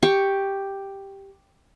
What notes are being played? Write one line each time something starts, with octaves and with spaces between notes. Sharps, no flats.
G4 C#6